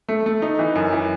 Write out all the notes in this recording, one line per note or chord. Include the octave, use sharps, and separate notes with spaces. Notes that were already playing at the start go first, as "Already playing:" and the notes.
A3
A3
D#4
E3
F#2
E3